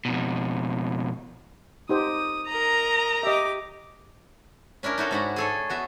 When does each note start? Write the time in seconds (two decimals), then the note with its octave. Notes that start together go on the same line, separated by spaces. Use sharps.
0.05 F2 B2
1.89 D#4 G4 C5 D#6
2.49 A#4 D#5 A#5
3.23 G4 D#5 E5 D6
4.83 C#4 D4 E4 A#4
4.98 D#4 E4 F#4 A4
5.11 G#2 D4 F#4 F#5 A#5 B5
5.36 G#4 A4 C#5
5.70 B3 F#4 E5